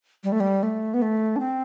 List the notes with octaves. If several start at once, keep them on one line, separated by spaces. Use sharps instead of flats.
G3
A3
G3
A3
B3
A3
D4
C4